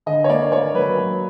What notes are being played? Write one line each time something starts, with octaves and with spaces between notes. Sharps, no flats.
D3 D#5
C#5
A#3 D5
A#3 C#5
F#3 B4
F#3